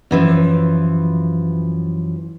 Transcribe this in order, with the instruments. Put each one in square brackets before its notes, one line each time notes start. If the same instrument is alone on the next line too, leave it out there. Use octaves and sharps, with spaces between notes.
[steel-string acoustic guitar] F#2 E3 F3